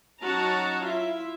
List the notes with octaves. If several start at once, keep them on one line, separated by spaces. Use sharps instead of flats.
F#3 C#4 D#4 F#4 A5 A#5
E4 F4 E5